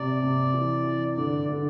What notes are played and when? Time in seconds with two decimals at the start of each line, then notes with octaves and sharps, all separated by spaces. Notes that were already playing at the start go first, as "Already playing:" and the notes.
Already playing: C3 D5
0.22 C3
0.53 E3
0.85 E3
1.16 D3 D5
1.48 D3